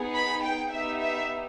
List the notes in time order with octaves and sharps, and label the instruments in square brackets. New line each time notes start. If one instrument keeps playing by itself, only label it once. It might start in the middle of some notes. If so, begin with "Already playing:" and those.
Already playing: [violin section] B3 D#4 G#4
B5
G5
B3 D#4 G4 E5
E5